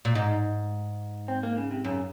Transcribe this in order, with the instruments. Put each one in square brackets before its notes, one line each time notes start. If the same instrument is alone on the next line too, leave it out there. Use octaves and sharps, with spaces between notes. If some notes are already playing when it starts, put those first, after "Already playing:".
[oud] A#2
[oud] G#2 [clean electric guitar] D#4
[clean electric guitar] C4
A#3
C#3
C3
[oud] F#2 [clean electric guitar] C#3